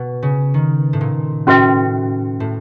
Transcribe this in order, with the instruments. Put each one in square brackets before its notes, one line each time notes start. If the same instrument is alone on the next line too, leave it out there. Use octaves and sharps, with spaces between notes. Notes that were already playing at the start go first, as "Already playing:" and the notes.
Already playing: [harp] B2
C#3
D#3
A2
A#2
[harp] A2 [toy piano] C#4 F#4 B4 E5 G5
[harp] A2